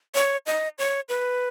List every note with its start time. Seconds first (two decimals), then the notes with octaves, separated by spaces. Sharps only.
0.15 C#5
0.46 D#5
0.79 C#5
1.09 B4